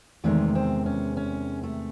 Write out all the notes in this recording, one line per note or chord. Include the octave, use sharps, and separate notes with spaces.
E2 C3 D#3 G#3 A3
C4
C#4
C#4
A3